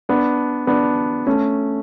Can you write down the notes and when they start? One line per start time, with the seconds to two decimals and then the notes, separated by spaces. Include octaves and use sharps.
0.09 B3 D4
0.67 B3 D4
1.27 A3 C#4